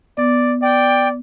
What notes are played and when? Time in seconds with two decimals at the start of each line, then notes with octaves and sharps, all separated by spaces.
0.17 B3 D5
0.62 D5 G5